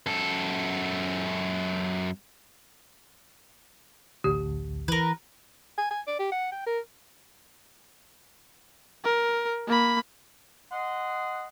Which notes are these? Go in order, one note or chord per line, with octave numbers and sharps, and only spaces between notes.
F#2 A4
A1 D2 G4
E3 A#4 B4
G#5
G#5
D5
G4
F#5
G5
A#4
A#4
A#3 B5
D#5 F#5 C6